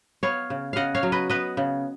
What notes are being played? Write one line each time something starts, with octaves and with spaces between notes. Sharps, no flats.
B3 C#5 F5
C#3
C#3 D#5 F5 F#5
C#5 F5
F#3
B4 D#5
B3 B4 D#5
C#3